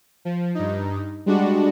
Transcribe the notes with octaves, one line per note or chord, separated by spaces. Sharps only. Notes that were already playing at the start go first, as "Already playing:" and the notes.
F3
G2 D#4
G3 G#3 D4 F#4